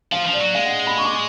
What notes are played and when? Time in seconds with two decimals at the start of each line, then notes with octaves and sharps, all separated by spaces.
0.12 F3 F5
0.27 F3
0.33 D5
0.40 F#3
0.55 G#3 F5
0.66 F#5
0.87 B5
0.97 C#6
1.05 D6
1.13 C#6